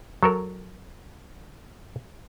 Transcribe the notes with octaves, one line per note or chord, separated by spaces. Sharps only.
F#3 A4 A#4